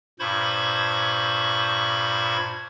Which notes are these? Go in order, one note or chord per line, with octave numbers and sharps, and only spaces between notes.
G2 A#2 C5 B5 C#6 G#6